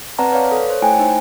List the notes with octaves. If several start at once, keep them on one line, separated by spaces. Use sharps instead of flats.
C4 B4 D5 F#5 A5 A#5
B4 C#5 D5 F5
A4
C5 C#5
A3 E4 G5 G#5
D#4 C5